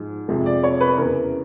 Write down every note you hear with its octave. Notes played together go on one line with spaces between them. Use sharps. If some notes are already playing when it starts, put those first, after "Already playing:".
Already playing: G#2 F3 G#3
F2 C3 F3 G#3
D5
C#5
B4
E2 C#3 E3 A#4